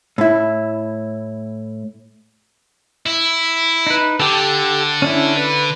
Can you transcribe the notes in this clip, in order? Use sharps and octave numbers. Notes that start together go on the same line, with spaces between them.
A2 E4
E4
D#4 B4
D3 G4 A4
C#4 D4 E4
B4